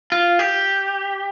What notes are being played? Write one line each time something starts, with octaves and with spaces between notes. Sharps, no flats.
F4
G4